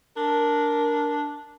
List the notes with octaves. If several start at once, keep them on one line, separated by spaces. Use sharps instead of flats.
D4 A#4